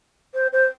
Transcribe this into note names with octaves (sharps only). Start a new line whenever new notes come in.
C5
C5